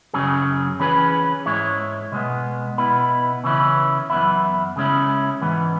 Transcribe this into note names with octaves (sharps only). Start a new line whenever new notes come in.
F#2 C#3 F#3 C#4 G#4
E3 C#4 G#4 B4
G#2 G#3 E4 C#5
B2 G#3 B3
B2 B3 E4 B4
C#3 E3 C#4 E4
F#2 E3 B3 E4
C#3 G#3 C#4 E4
G#2 E3 B3